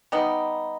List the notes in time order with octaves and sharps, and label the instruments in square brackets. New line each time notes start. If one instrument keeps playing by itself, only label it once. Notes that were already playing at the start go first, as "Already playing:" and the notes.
[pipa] G3 B3 D#4